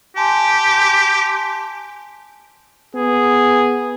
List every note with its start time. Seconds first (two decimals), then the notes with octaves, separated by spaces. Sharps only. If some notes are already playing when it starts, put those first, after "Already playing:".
0.16 G4 G#5 A5 C6
2.95 B3 G#4